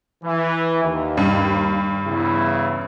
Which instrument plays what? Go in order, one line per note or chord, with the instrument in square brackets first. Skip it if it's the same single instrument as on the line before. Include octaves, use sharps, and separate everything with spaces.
[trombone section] E3
D#2
[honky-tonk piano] G2
[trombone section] E2 C#3 E4